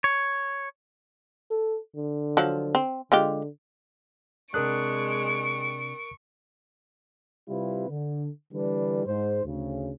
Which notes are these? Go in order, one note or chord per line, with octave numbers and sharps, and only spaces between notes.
C#5
A4
D3
F3 F#3
C4
D3 G#3 F4 G4
C3 G#3 D4 A#4 C#6 D#6 F#6 D7
C3 G3 C4 E4 F4 B4
D3
D3 E3 G3 D4 B4
G#2 C5
D2 C#3